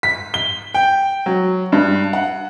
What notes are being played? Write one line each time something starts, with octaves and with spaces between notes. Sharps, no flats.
B6
G7
G5
F#3
G2
F#5